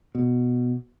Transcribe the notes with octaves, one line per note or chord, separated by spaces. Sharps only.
B2